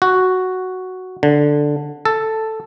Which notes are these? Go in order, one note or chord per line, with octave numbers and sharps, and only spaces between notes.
F#4
D3
A4